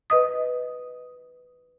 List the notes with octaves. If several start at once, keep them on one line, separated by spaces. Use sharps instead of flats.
B4 D#5 D#6